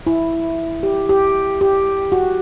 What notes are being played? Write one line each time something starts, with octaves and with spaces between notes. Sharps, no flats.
E4
G4
G4
G4
F#4